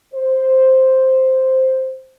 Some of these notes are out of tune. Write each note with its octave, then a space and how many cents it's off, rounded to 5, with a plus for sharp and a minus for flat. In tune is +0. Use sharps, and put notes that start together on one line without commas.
C5 +0